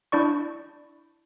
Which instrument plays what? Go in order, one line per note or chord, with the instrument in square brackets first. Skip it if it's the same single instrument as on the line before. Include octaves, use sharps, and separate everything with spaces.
[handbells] D4 E4 D5 C#6